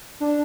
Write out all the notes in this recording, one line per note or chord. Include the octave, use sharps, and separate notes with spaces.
D4